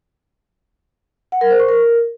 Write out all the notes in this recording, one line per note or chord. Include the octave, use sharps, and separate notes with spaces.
F#5
A#4
C5
C#6
A#4